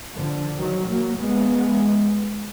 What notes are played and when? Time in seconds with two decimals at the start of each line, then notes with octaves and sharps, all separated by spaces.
0.14 D3 F3
0.57 D#3 F#3
0.87 F#3 A#3
1.17 G#3 B3